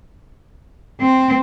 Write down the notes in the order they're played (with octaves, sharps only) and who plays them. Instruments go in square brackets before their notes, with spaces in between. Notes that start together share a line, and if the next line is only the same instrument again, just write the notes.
[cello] C4